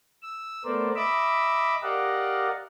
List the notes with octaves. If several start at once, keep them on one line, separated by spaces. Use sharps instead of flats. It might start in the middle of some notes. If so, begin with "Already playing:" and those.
E6
A3 B3 A#4 C5 D5
D#5 E5 B5 D6 E6
G4 A#4 D5 D#5 F5 F#5